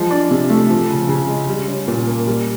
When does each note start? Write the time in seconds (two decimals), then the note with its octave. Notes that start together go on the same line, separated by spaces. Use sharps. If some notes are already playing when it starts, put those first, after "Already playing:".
Already playing: F3 G#3
0.11 D4
0.31 C3
0.50 A3
0.70 F3
0.89 C#3
1.09 C#3
1.28 G#3
1.49 G3
1.68 C#4
1.88 A#2
2.07 A#3
2.26 G3